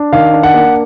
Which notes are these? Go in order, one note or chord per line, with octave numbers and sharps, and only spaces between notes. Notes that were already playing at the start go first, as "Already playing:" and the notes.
Already playing: D4
D#3 F5
D4
F#5
A#3